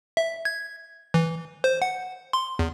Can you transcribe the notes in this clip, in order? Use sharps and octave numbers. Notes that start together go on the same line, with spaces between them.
E5
G#6
E3
C5
F#5
C6
E2